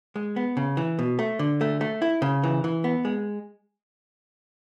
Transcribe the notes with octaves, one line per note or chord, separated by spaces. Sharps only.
G#3
B3
C#3
E3
B2
A3
D3
A3
A3
E4
C#3
E3
E3
B3
G#3